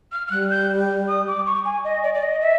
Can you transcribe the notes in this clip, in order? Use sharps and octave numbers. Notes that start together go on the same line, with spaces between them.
F6
F6
G3 F#6
G6
D#6
D6
C#6
G#5
D#5
D5
D5
D#5
E5